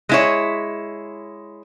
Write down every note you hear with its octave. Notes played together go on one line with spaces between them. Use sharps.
G#3 E4 C#5